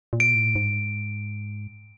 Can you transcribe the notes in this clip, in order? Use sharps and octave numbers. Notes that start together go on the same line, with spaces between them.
A#2
D7
A2
G#2